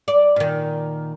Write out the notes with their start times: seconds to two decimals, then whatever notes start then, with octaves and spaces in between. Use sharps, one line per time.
0.08 D5
0.36 A#2 D#3